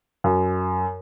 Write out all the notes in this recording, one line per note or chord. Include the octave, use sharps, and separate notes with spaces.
F#2